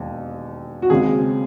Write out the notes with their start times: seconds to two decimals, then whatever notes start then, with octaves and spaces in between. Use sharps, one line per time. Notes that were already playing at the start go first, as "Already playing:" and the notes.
Already playing: E1 D#2
0.82 F#4
0.90 D#2 C#3 G#3 C4 G#4